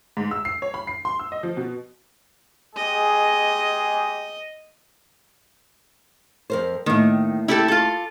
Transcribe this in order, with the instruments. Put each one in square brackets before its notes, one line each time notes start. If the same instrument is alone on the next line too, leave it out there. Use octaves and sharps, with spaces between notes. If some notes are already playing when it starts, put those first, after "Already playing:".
[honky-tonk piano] G#2
E6
C7
C#5
B5
C7
C6
E6
D#5
F3
B2
[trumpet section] G#3 G4 G#4 [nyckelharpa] D#5
[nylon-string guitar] F2 A#4 C5
[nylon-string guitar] A2 A#3 [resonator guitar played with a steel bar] D#3
[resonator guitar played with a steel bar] E4 G4 A4
F4 A4